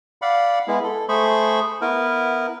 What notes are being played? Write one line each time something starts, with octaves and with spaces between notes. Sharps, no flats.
D5 F5 F#5 B5
G#3 B3 E4
A4
A3 G#4 C5 B5 C#6
B3 E4 A#4 B4